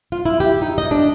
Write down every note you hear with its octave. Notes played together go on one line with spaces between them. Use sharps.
F4
E4
G4
D#4
D#5
D4